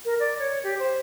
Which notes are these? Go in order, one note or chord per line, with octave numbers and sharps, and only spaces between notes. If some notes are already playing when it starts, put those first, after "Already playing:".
A#4
D5
C#5
G4
C5